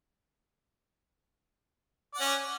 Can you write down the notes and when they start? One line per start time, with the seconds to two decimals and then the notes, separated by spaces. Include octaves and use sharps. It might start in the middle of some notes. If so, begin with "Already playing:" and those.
2.14 D5
2.17 F#5
2.21 C#4